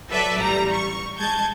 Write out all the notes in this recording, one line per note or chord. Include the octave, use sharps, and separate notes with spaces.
F#3 A4 B4 D5 E5
A1 G3 A#5
C#6
G#3 A5 G6 G#6